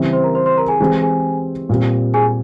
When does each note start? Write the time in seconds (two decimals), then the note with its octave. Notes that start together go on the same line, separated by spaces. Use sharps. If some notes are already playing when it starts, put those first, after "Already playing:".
Already playing: C#3 E3 G3 C4 E4
0.13 C5 C6
0.24 A#4 A#5
0.35 C5 C6
0.46 C5 C6
0.58 A#4 A#5
0.68 G#4 G#5
0.80 E3 G#3 C4 G4 G#4 G#5
1.02 G#4 G#5
1.69 A#2 G3 C4
2.14 G#4 G#5